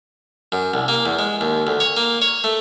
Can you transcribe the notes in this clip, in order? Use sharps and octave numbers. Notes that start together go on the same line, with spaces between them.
F#2
C2
A#3
E2
G#3
D#2
D2
C#5
A#3
C#5
A3